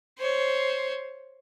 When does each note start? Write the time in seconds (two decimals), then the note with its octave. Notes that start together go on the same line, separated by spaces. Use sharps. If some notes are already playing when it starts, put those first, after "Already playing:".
0.18 C5 C#5